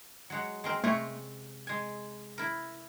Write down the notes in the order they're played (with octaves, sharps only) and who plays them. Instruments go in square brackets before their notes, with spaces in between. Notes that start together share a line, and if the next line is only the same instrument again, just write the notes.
[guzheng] F#3 G#3 F#5
G#3 C4 A#4
[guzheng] C3 C#5 A#5 [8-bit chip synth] A3
[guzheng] G#3 G#5
E4 A#4